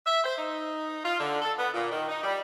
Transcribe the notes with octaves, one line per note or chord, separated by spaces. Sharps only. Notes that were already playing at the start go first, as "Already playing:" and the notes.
E5
C5
D#4
F4
D3
A4
B3
A#2
D#3
D#4
G3